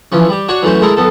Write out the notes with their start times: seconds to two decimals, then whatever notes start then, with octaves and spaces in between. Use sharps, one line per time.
0.12 E3 F3 C#4
0.29 G3 G4
0.48 D4 F#4 C#5
0.62 E3 F#3 A3 C#4 C5
0.81 G#3 E4 A4 A#4
0.97 B1 B3 A4